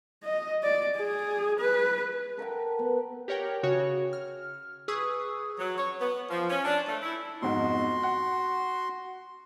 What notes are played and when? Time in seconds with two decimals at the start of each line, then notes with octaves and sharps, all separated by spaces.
0.24 D#5
0.64 D5
0.97 G#4
1.60 B4
2.38 A4 A#4 F#5 G5
2.79 B3
3.28 G4 A#4 C#5 F#5 G5
3.63 C#3 F#4 C#5
4.13 F6
4.88 G#4 B4 C#6 D#6 E6
5.59 F#3
5.78 C#5
6.01 B3
6.30 F3
6.50 C#4
6.65 D4
6.89 A3
7.03 E4
7.42 B1 F2 G#2 F#4 C6
8.03 F#5